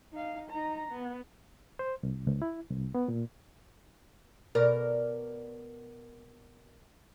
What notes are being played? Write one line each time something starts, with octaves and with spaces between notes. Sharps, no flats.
D#4 F5
D#4 A#5
B3
C5
C2
C#2
E4
C2
B3
A#2
B2 A#4 D5